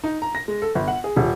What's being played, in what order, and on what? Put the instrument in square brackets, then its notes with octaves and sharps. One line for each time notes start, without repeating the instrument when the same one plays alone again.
[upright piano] D#4
A#5
A#6
G#3
A4
G1
F#5
G#4
D#1